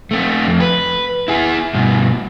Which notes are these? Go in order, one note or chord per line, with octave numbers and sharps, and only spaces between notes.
A3 C4
F2
B4
E4 G#4
G2 B2